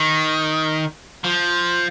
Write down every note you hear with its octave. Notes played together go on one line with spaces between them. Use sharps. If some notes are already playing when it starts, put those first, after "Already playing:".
Already playing: D#3
F3